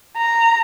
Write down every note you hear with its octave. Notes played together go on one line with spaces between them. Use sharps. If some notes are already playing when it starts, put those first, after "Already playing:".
A#5